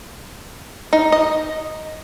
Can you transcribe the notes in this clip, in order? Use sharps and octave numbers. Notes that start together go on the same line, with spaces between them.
D#4
D#5